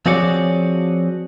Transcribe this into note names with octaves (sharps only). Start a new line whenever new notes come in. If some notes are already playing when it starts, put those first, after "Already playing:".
F3 C4 F#4 G#4 C#5 D5